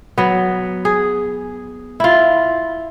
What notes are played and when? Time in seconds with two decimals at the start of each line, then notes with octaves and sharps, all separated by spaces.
0.18 F#3 B3
0.85 G#4
2.00 E4 F4